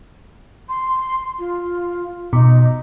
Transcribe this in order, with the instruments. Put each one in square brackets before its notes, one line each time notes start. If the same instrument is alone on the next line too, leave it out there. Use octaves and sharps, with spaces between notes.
[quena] C6
F4
[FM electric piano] B2 [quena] D#4